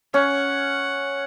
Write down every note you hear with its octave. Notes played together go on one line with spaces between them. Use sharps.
C#4 F#5